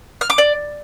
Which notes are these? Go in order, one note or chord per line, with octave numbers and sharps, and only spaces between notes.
F6
D6
D5